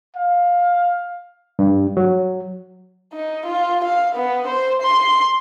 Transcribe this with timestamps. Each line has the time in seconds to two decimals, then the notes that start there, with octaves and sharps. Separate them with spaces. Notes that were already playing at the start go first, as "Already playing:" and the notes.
0.16 F5
1.59 G2
1.97 F#3
3.14 D#4
3.47 F4
3.85 F5
4.16 B3
4.48 C5
4.83 C6